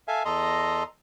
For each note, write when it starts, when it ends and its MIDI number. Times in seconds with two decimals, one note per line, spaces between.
0.08 0.23 69
0.08 0.23 76
0.08 0.23 77
0.08 0.23 80
0.25 0.83 40
0.25 0.83 69
0.25 0.83 75
0.25 0.83 82
0.25 0.83 84